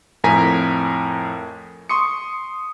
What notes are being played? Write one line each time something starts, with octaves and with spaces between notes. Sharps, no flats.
F2 A2 A#4 G#5 A#5 B6
C6 C#6 D#6 C#7